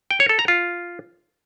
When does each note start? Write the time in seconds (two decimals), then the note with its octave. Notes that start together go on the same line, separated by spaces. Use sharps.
0.11 G5
0.20 C#5
0.29 A4
0.39 A#5
0.48 F4